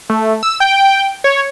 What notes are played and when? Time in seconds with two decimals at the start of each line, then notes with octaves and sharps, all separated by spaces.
0.09 A3
0.43 E6
0.60 G5
1.24 C#5